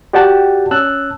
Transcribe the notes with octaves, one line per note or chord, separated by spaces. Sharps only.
F#4 G4 D5 F#5 G5 A5
C#4 A5 E6 F#6